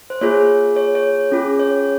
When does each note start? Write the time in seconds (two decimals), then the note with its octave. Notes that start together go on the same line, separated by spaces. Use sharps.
0.10 C5
0.21 A#3 F4 G#4 C#5
0.76 C#5
0.95 C#5
1.32 C#4 F4 G#4
1.59 C#5